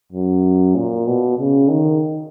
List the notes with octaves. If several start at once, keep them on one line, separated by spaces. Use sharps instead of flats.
F#2
A#2
B2
C#3
D#3